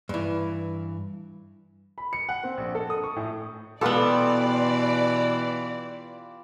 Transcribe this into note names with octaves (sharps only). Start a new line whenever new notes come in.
G2 E3
B5
C#7
F#5
C4
A#1
A4
D#6
C#6
A2
B2 E3 B3 F4 G4 A4 B4 D5